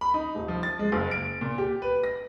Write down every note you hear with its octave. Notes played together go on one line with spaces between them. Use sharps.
B5
D#4
D#1
F3
A6
G#3
F#1
D7
A#2
G4
B4
A#6